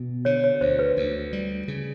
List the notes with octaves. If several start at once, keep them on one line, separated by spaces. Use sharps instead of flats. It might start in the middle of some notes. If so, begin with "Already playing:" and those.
Already playing: B2
D3 C#5
C#5
D2 C5
B4
D2
G3
C#3